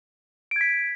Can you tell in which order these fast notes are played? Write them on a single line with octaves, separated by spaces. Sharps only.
D7 G#6 B6